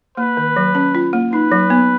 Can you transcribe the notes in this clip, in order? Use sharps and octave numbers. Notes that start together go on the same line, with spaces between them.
A#3 B4
D#3
F#3
C#4
F4
A#3
D#4 B4
F#3
B3